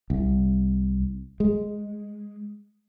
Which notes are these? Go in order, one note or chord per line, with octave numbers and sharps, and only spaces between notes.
C2
G#3